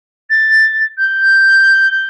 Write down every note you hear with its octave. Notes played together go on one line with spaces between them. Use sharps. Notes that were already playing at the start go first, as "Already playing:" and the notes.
A6
G6